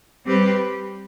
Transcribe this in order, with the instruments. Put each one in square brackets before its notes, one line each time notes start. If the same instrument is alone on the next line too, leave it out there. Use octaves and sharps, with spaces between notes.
[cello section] G3 C4 G4 B4